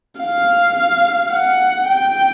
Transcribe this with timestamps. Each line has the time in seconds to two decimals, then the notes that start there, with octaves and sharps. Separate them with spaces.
0.20 F5
1.32 F#5
1.88 G5